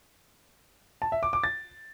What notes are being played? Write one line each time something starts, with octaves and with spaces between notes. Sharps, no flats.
A5
E5
D6
D6
A6